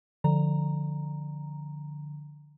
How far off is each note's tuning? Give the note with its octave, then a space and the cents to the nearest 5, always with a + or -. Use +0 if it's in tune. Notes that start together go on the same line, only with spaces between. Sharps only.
D3 +10 F3 +0 A#5 +0